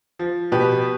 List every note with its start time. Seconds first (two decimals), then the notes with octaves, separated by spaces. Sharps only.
0.19 F3
0.52 B2 G4 B4